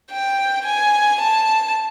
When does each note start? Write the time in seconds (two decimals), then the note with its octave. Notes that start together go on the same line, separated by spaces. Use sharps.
0.11 G5
0.66 G#5
1.22 A5